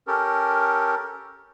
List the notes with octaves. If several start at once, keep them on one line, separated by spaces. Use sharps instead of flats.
C#4 G4 A4 A#4